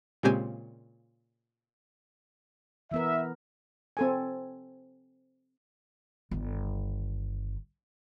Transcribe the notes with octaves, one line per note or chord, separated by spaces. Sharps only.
A#2 C#3 G#3 C4 G4 G#5
E3 B3 A#4 E5
C4 A4 G#5
G1 D#3